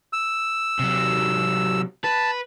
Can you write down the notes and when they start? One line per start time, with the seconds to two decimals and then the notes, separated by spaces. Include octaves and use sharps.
0.13 E6
0.79 C3 F#3
2.04 B4 A5